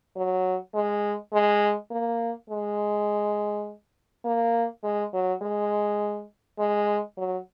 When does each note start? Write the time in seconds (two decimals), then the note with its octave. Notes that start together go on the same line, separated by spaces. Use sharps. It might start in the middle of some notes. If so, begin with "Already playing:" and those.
0.16 F#3
0.74 G#3
1.33 G#3
1.91 A#3
2.50 G#3
4.25 A#3
4.84 G#3
5.13 F#3
5.42 G#3
6.59 G#3
7.17 F#3